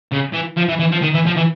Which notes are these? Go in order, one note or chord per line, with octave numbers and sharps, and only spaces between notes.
C#3
E3
F3
E3
E3
F3
D#3
E3
F3
E3